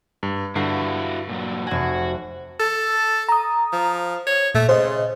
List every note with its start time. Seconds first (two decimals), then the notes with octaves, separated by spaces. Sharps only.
0.23 G2
0.56 G2 D3 E4 F#4 C7
1.29 A#2 F#3
1.67 F1 F#4 G#5
2.60 A4
3.29 A#5 D#6
3.73 F3
4.27 C#5
4.55 A#2 A3
4.69 C#3 C5 D#5